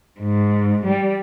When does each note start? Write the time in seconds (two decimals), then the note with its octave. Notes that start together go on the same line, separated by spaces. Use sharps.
0.20 G#2
0.87 G3